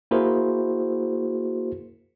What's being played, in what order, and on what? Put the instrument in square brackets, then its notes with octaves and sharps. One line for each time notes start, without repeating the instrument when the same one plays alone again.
[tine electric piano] A#3 E4 F#4 G#4 A#4 C5